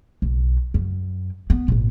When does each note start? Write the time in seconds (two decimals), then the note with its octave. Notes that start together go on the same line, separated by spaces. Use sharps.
0.22 B1
0.74 F#2
1.50 B3
1.68 G#1 A#2